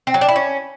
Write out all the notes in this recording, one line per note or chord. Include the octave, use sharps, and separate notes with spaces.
C4
F#3
D4
E4
C#4